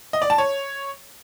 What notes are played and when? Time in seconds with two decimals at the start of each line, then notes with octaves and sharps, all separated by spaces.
0.13 D#5
0.22 D5
0.30 A5
0.38 C#5